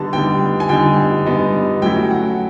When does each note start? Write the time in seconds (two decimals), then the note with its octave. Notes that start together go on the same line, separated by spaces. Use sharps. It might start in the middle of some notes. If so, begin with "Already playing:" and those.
Already playing: D3 G3 B3 D#4 A5
0.13 D3 G3 B3 D#4 G5
0.60 G#5
0.69 D3 G3 B3 D#4 G5
1.26 D3 G3 B3 D#4
1.82 F#3 A3 C#4 E4 G5
2.11 F#5